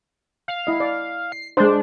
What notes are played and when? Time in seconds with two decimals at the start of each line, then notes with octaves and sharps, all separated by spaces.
0.48 F5
0.67 E4 D#5
0.80 D5
1.32 C7
1.57 G#3 D4 C5